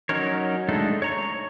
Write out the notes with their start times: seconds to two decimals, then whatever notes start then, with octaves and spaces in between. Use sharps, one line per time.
0.09 F#3 C#4 D#4 A#4 C#5
0.69 G#3 A3 D4 D#4 A4
1.02 C#5 A#5 C#6